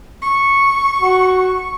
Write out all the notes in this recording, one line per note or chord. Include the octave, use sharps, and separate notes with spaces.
C#6
F#4